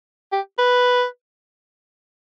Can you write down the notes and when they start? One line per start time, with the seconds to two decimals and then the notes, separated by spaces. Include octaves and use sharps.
0.33 G4
0.58 B4